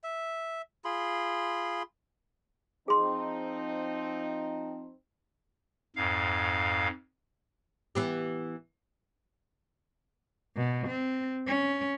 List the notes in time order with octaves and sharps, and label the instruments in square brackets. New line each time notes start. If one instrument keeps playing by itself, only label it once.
[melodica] E5
F4 G#4 B5 C6
[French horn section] F3 C4 D#4 [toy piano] G#4 C6
[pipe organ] F2 G#2 F5
[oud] E3 B3 G4
[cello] B2
C4
C#4